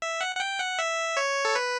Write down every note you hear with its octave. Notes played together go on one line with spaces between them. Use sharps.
E5
F#5
F#5
G5
F#5
E5
C#5
A4
B4